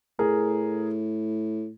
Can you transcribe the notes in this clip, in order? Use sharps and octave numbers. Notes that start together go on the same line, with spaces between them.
A2 G#4 A#4